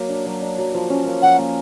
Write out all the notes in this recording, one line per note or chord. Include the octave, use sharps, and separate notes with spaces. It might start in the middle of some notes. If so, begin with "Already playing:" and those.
Already playing: F#3 A#3
D4
F#3
D4
F#3
F3
C#4
A#3
F3 F#5
A#3